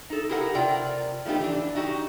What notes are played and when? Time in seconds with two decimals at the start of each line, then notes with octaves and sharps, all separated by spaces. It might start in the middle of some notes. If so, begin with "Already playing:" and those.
0.10 D#4 A4
0.29 E4 G4 G#4 A#4 F#5
0.54 C3 F4 A#4 D5 G5
1.25 F3 A3 B3 D#4 G4
1.40 E3 D4
1.76 D#4 F#4 G4